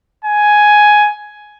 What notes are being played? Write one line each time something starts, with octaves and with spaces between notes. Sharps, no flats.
G#5